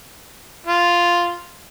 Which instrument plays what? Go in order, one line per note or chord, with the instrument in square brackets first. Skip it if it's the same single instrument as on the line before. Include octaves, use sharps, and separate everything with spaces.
[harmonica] F4